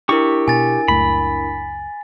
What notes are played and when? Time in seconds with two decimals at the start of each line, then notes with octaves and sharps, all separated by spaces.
0.09 D4 E4 G4 A#4 C#6
0.48 B2 B3 G#5 A6
0.88 F#1 C#2 A3 B5